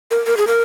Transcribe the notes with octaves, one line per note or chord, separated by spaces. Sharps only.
A#4
A#4
G#4
A#4